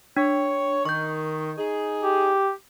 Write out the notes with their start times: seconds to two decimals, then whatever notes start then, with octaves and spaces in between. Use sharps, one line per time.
0.17 D4 C#5
0.85 D#3 C#6 G6
1.58 D#4 G#4
2.03 G4